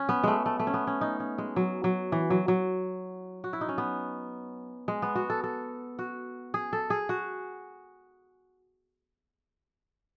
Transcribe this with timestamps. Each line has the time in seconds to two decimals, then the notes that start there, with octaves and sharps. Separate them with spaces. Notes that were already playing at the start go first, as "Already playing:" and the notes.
Already playing: C#4
0.09 B3
0.24 G#3 A3
0.46 A3
0.59 A3
0.67 C#4
0.74 B3
0.87 C#4
1.01 D#4
1.20 C#4
1.38 G#3
1.56 F#3
1.84 F#3
2.12 E3
2.30 F#3
2.48 F#3
3.44 F#4
3.53 E4
3.61 D#4
3.69 C#4
3.78 B3
4.88 G#3
5.02 B3
5.15 F#4
5.30 A4
5.44 A4
5.99 F#4
6.54 G#4
6.73 A4
6.90 G#4
7.09 F#4